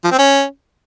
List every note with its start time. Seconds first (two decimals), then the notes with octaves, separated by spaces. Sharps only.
0.04 F3
0.11 C4
0.18 C#4